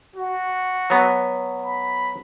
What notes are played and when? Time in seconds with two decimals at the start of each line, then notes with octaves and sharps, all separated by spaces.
0.16 F#4
0.90 F#3 B3
1.62 B5